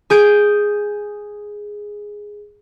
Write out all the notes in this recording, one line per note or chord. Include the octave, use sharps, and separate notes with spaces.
G#4 G6 D7